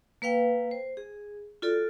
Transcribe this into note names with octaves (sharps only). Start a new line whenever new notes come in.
A#3 B4 F5 G5
C5
G#4
F4 F#4 A4 D5